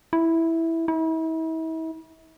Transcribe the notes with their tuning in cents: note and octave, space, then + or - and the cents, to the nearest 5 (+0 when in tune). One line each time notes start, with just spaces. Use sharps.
E4 -5
E4 -40